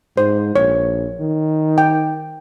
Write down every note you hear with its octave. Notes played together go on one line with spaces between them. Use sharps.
G#2 C5
A#1 C#5
D#3
G5